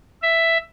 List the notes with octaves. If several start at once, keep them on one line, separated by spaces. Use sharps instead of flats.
E5